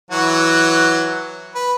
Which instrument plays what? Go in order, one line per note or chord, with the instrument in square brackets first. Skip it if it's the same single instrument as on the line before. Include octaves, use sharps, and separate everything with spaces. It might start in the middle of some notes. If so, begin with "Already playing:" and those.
[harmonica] E3 F#3 F#4
B4